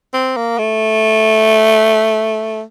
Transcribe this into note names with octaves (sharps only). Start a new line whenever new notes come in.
C4
A#3
A3